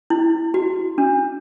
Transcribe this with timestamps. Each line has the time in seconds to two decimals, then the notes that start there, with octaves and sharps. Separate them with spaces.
0.10 E4
0.54 F#4
0.98 D4